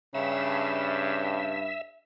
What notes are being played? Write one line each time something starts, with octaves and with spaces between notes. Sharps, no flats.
G2 C#3 E5